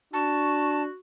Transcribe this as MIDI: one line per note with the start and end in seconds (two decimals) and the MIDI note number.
0.13 0.88 62
0.13 0.97 66
0.13 0.82 81
0.13 0.74 85